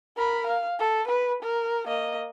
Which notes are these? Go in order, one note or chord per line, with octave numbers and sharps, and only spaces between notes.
A#4 B5
F5
A4
B4
A#4
A#3 D#5